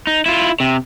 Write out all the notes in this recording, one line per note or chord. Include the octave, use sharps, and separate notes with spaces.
D#4
E4 F4
C3